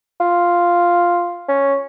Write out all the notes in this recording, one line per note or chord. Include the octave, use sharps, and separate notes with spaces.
F4
C#4